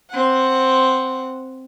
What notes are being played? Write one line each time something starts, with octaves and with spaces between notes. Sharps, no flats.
C4 F#5